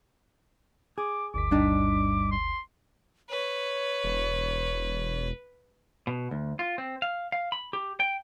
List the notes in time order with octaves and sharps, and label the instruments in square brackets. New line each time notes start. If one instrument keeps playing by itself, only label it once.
[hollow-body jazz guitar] G#4 [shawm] D6
[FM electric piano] G1 D2 B6 [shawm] D6
[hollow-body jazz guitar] G2 D4 D#4
[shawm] C6
[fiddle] B4 [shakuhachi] C#5
[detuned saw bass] E1
[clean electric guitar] B2
D2
F4
C4
F5
F5
B5
G4
G5